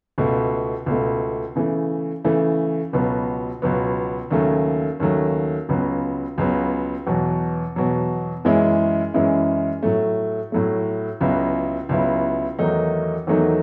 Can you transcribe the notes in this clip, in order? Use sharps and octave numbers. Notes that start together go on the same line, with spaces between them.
C#2 B2 A3
C#2 B2 A3
C#3 E3 A3
C#3 E3 A3
C#2 B2 F#3 B3
C#2 B2 F#3 B3
D#2 C#3 F#3 A3
D#2 C#3 F#3 A3
C#2 C#3 F#3 B3
C#2 C#3 F#3 B3
E2 B2 F#3
E2 B2 F#3
F#2 E3 G#3 C#4 E4
F#2 E3 G#3 C#4 E4
A2 F#3 A3
A2 F#3 A3
C#2 C#3 F#3 B3 E4
C#2 C#3 F#3 B3 E4
E2 D#3 F#3 A3 D#4
E2 D#3 F#3 A3 D#4